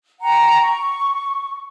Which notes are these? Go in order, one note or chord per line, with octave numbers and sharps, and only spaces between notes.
F#5 G5 A#5
C#6